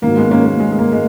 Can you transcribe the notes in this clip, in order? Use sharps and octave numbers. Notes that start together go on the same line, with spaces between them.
G#2 D#3 F#3 A#3
G#3 B3
A#3 C#4
A#3
G#3
G#3
A#3
G#3